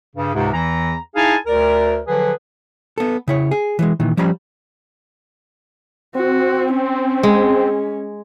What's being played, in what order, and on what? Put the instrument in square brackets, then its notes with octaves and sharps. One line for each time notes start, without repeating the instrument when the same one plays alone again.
[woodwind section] G2 C#3
C#2 G#2 C3
E2 E3 A#5
D#4 E4 G#4 F5 G#5 A5
D2 A#4 D5
D3 F3 F#3 G#4 B4
[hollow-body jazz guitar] B3 A4
C#3 E4 C#5
G#4
E3 F3 G#3
A#2 D#3 E3
F3 G3 C#4 A#5 B5
[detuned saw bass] C4 [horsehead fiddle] F#4
[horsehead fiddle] C#4
[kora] G#3